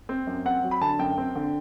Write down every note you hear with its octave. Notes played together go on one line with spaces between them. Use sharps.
C4
F#2
C4 F#5
F#3
B5
D3 A5
F#2 G5
C4
D3